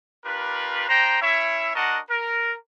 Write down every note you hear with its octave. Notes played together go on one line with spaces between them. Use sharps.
D4 F4 G4 A#4 B4
D4 C5 G5 A#5
C#4 E4 C#5 E5
D4 F#4 A#4 D#5 F#5 A5
A#4